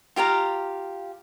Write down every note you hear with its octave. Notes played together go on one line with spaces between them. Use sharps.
F4 G4 F5 A#5